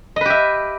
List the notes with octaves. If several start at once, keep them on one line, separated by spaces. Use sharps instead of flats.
G4 B4 D#5 E5